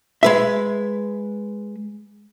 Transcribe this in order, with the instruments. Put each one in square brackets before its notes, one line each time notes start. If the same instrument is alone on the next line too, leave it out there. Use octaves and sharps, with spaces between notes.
[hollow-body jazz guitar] G#3 B4 E5